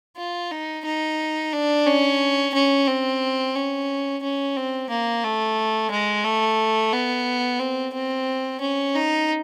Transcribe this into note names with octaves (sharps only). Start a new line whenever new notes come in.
F4
D#4
D#4
D4
C#4
C#4
C4
C#4
C#4
C4
A#3
A3
G#3
A3
B3
C4
C4
C#4
D#4